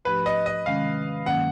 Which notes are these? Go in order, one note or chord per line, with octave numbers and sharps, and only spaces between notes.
G#2 F3 A3 D4 G4 B4
D#5
D#5
C3 D#3 G#3 C#4 F5
G2 D#3 F#3 A#3 C#4 F#5